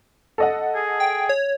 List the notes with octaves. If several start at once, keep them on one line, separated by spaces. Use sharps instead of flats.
A4 D#5 F#5
G#4
G5
C#5